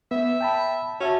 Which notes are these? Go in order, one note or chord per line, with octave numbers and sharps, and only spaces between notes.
B3 E5
G5 A5 B5
C#4 F#4 E5 A5